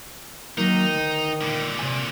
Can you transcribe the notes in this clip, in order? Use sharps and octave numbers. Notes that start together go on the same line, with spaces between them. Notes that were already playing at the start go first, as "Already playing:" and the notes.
D#3 F#3 A#3 D#4
D2
A#2 D3
C3 G#5